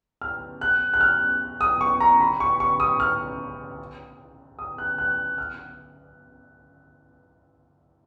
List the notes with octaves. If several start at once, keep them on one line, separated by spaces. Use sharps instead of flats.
F6
F#6
F#6
F6
D#6
C#6
A#5
B5
C#6
C#6
D#6
F6
D#6
F#6
F#6
F6